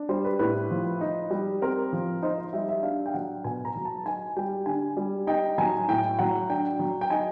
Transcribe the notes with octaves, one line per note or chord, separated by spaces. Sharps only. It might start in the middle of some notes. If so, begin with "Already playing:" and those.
Already playing: D4
G3 C5
B4
A2 B4
F3
D#4
G3
C4 A#4
F3
D#4 C5
D#5
G3 E5
E5
D4 F5
G5
F#3 F#5
B2 G#5
A#5
F#3
A5
D#4 G#5
G3 G5
D3 G#5
G3
D#4 G5
F#3 G#5
A2 G5
F#3 F#5
D4 G5
F#3
G5
D#4 G#5